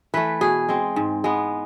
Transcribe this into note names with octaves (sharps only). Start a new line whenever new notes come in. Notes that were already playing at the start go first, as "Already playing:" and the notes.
E3 A3 B4
B2 G#4
G#3 C4
G#2
G#3 B3